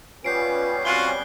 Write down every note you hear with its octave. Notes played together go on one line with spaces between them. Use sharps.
G3 B3 C#4 F4 B4 G6 C7 D7
C4 F4 F#4 F#6 G7